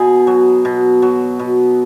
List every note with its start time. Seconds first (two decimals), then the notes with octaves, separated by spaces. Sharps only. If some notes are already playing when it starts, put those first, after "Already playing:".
Already playing: B2 G#4
0.27 F#3
0.65 B2
1.02 F#3
1.39 B2